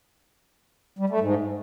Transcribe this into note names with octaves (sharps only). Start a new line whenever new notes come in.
G3
A3
G#2